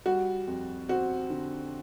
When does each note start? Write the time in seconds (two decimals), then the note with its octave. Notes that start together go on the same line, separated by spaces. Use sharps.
0.06 G3 F#4
0.47 F2
0.89 C4 F#4
1.30 D3